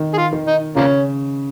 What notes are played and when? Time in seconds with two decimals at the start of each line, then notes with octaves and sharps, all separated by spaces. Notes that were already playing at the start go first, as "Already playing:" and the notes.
Already playing: D#3
0.14 G#4
0.17 F4
0.33 D#3
0.47 D#4
0.76 C#3 F3 A#3 C#4